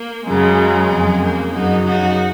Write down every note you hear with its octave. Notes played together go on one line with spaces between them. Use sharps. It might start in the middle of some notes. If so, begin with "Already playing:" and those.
Already playing: A#3
F#2 C#3 F#3 G#3
F2 C#3 F#3
A#3
F#2 C#3 F#3 D#4 F#4
D#4 F#4